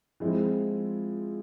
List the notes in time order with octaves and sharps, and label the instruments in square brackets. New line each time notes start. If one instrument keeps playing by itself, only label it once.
[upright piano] F3 G#3 C4 E4